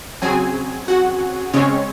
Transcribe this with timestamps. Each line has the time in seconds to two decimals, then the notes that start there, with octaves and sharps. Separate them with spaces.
0.22 C#3 F#3 C4 G#4 G#5
0.88 F#4 F#5
1.53 C#3 G#3 C4 C#4 C#5